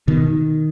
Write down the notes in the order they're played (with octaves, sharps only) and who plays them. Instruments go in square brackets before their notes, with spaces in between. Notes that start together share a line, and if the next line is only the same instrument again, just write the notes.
[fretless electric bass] B2 D#3